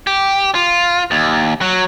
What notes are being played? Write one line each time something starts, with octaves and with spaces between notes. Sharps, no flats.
G4
F4
D#2
F#3